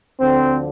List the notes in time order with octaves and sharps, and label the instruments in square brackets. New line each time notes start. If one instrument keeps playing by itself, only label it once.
[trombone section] D2 D3 F3 C4